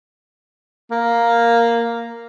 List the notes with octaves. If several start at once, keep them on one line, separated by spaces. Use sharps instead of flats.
A#3